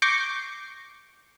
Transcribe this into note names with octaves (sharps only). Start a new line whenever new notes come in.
C#6 D6 G6 A#6 C7